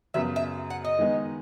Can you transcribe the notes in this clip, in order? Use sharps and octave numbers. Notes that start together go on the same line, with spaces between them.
F#2 C#3 F#3 B3 E5
E5
F#5
D#5
D#3 G#3 B3 D#4